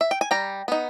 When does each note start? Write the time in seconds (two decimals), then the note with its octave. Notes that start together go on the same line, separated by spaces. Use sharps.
0.01 E5
0.11 G5
0.21 G#5
0.31 G3 G5 A#5
0.68 B3 D#4